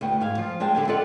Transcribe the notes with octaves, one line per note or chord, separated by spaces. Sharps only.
D2 B3 G5
G#2 F5 G#5
F3 F4
F3 G3 G#3 G5 A5
D3 G4 G#5
F4 G4 A4 D5 D#5 F#5